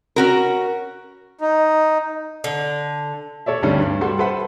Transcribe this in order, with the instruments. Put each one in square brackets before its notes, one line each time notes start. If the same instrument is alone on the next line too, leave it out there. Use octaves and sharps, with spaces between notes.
[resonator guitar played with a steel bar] C#4 F#4 A#4
[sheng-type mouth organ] D#4
[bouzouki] D3
[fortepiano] A4 C#5 D5 E5
D2 G2 C3 G3 C#4 D4
G2
G3 F#4 A4 C6
A4 B4 C5 E5 F#5 B5